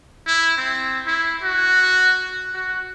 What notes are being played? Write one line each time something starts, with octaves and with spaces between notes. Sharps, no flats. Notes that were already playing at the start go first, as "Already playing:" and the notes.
E4
C4
E4
F#4
F#4